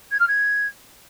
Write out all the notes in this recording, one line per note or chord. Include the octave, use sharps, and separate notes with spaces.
G#6
F6
G#6